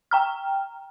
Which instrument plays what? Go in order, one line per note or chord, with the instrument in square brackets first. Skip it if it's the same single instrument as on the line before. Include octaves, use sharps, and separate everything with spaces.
[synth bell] G5 A#5 F6